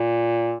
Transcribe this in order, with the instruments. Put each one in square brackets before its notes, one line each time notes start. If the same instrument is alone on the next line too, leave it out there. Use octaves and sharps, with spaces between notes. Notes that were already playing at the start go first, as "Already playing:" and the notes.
Already playing: [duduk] A#2